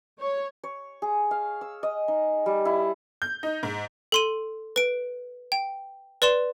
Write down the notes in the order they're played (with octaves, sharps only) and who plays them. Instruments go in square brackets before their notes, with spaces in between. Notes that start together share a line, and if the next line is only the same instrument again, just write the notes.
[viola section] C#5
[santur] C#5
G#4
F5
E6
D#5
D#4
G3
E4
[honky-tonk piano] G6
D#4
G#2
[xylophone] A4 C6 D#7
B4 D7
G5
B4 D5 C6 E7